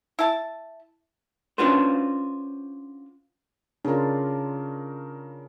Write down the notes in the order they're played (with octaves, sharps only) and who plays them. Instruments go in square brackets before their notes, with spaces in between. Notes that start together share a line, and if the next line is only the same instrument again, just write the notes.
[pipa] E4 A5
[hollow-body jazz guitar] C#4 D4 F4 F#4 B4 C5
[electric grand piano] C#3 A#4 [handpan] D4 F4